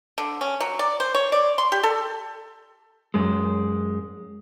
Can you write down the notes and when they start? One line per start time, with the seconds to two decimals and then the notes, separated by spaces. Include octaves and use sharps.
0.18 D3
0.41 C#4
0.60 F#3
0.79 D5
1.00 C5
1.15 C#5
1.32 D5
1.58 C6
1.72 G4
1.83 A4
3.14 F#2 G#3